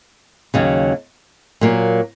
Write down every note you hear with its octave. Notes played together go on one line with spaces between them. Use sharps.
D#2 C#3 F#3
A#2 F#3 A#3